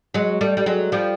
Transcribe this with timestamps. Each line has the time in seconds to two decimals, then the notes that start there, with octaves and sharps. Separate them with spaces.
0.14 F#3 G#3
0.41 G3 A3
0.57 G3
0.66 F#3 G#3
0.92 F3 G3